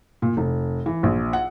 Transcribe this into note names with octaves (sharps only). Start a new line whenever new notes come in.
A#2
F1
E3
A#1
F#5